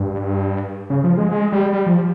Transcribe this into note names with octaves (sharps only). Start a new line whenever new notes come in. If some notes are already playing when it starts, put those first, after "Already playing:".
Already playing: G2
C#3
F3
G#3
G#3
G3
G3
F3